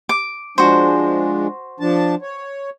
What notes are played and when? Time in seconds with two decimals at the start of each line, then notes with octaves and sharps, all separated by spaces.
0.09 D6
0.58 F3 G#3 D4 F#4 C5
1.80 F3 D4 A5
2.22 C#5